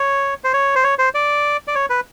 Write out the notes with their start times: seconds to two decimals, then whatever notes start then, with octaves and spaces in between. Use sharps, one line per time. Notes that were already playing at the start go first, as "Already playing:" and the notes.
Already playing: C#5
0.44 C5
0.53 C#5
0.75 C5
0.84 C#5
0.99 C5
1.14 D5
1.67 D5
1.75 C#5
1.90 B4